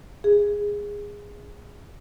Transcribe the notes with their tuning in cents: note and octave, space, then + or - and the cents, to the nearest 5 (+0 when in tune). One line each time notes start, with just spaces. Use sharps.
G#4 -15